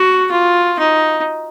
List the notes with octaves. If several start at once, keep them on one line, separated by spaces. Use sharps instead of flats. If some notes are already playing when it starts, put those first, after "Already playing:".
Already playing: F#4
F4
D#4